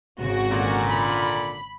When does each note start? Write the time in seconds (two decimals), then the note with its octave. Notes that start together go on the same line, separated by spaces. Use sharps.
0.19 G#1 C#3 F#4
0.51 A#2 D3
0.90 B5